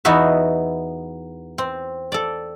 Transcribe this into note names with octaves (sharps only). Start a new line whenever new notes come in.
E2 B3 D#4 F#4 E5
C4
A4 D5